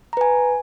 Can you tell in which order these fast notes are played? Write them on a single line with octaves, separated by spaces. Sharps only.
A#5 B4 G#5